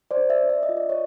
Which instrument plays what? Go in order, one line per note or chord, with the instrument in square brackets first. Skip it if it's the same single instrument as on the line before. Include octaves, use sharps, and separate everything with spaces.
[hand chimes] C5 D5
D4
D5 E5
D4
E5
D#5
F4
D5
C#5 D#5